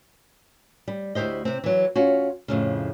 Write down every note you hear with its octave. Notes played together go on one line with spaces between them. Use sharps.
G3
D2 E4 G4 C5 D#5
C3 C4
E3 F#3
C#4 F4 F#4
F2 A2 C#3